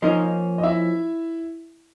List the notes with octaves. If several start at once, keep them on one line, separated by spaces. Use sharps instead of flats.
F3 A#3 C#4 D#4 D#5
D#5
E4 E5